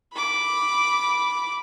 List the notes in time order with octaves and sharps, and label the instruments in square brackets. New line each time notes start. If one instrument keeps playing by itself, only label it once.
[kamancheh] B5 D6